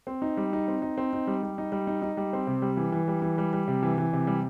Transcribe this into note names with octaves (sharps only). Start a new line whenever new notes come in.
C4
D#4
G3
D#4
C4
D#4
C4
D#4
G3
G3
D#4
G3
D#4
D#4
G3
C4
C3
G3
E3
E3
G3
E3
G3
G3
C3
E3
E3
C3
G3